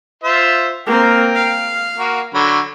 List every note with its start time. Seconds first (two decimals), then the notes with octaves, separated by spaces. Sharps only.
0.23 F4 C5 E5
0.86 A#3 C4 A#4 G5
1.35 F5
1.98 A#3 F#4
2.34 D3 F#3 B5